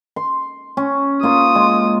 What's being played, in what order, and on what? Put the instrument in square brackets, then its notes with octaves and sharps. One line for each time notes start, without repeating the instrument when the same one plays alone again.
[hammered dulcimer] C6
C#4
[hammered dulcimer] A#3 F4 C6 [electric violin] D#6
[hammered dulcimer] G#3